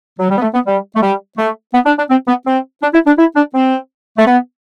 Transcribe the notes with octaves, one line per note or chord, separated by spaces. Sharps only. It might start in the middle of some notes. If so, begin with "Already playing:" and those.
F#3
G3
B3
A3
B3
G3
A3
G3
A3
B3
D4
D4
C4
B3
C4
D4
E4
D4
E4
D4
C4
A3
B3